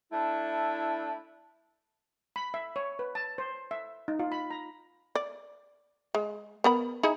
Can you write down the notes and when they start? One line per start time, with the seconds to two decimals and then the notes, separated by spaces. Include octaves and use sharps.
0.12 A3 D4 E4
2.36 B5
2.54 E5
2.76 C#5
2.99 B4
3.15 A5
3.38 C5
3.71 E5
4.08 D#4
4.19 F4
4.32 B5
4.50 A#5
5.15 D5
6.15 G#3
6.64 B3 A#4 B5
7.03 D#4 E4 G#4